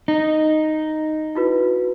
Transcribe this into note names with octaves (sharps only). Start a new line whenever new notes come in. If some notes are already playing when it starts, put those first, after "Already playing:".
D#4
E4 F#4 B4